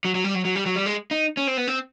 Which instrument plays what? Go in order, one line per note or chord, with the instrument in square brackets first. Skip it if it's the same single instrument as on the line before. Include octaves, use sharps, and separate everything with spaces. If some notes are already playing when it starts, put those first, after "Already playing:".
[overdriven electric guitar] F#3
F#3
G3
F#3
F#3
G3
F#3
G3
G#3
D#4
C#4
C4
B3
C4